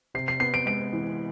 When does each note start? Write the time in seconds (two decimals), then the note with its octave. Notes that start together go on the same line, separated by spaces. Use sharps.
0.14 C3 C7
0.28 C7
0.40 B3 C7
0.54 D7
0.66 G#3 D7
0.93 E3